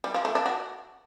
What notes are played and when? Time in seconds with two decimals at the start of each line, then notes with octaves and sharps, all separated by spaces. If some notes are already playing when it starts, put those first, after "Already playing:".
0.04 G3
0.14 F3
0.25 A3
0.35 D4
0.46 F#4